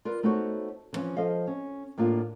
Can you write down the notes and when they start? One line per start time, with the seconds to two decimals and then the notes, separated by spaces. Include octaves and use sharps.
0.05 F4 A#4 B4 D5
0.23 A3 B3 D#4 F#4 C5 C#5
0.93 D3 E3 F3 C#4
1.17 F3 A4 D#5 F5
1.47 C#4
1.98 A2 A#3 D4 F4